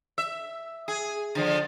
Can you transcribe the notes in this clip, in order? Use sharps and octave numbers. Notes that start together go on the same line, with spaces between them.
E5
G#4
D3 F3 G#3